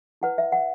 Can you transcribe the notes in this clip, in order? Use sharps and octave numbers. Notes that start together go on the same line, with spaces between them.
E4 B4 F#5
E5
F#5